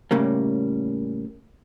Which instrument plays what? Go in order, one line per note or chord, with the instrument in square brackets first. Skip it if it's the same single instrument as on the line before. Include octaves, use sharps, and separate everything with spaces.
[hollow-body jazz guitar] A2 C#3 G3 A#3